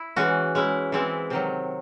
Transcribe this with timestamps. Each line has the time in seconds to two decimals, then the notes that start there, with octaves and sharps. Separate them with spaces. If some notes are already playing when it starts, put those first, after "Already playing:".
Already playing: E4
0.16 E3 G#3 C#4 F#4
0.55 G#3 C#4 E4
0.92 E3 G#3 C4 E4
1.30 C3 D#3 F#3